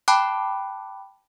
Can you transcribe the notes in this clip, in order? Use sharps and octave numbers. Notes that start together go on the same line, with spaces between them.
G5 A5 B5 D6 F#6